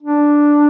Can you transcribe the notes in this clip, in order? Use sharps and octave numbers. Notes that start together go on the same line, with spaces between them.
D4